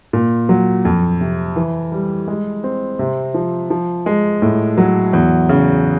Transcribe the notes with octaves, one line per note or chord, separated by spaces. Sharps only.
A#2
F#3
F2
C3
E3
G3
G#3
C4
C3
F3
F3
G#3
A2
F#3
E2
C#3